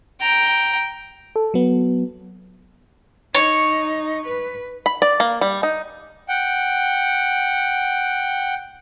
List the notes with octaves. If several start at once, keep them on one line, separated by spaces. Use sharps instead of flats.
G5 A#5
A4
F#3 B3
D#4 C#5
B4
B5
D5
A#3
G3
D#4
F#5 G5